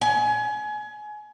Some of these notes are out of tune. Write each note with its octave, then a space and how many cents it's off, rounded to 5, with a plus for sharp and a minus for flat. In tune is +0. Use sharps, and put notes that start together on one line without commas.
G#5 +25